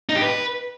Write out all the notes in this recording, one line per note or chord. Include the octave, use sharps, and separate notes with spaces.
D#4
G4
B4